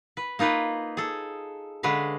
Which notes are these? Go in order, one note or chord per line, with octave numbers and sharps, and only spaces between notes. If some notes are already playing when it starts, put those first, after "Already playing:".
B4
A#3 D#4 F4 B4
G#4 A4
D3 G#3 C#4 B4 F5